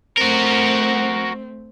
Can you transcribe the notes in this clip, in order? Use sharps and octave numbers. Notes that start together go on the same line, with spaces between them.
A3 C4 F#4 A#4